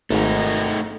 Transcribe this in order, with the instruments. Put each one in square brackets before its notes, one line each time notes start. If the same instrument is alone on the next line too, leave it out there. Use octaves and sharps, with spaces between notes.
[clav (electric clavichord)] G#1 G#2 [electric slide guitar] A3 D#4